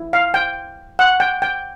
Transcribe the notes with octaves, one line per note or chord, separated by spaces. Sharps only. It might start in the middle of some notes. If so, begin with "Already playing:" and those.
Already playing: E4
F5
G5
F#5
G5
G5